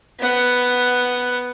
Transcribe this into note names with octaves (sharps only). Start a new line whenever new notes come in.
B3 F#5